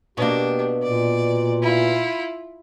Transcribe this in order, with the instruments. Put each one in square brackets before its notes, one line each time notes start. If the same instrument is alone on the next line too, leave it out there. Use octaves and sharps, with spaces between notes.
[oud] B2 A#3 [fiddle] D4 [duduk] G4
[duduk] A#2 [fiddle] D5
[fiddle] E4 F4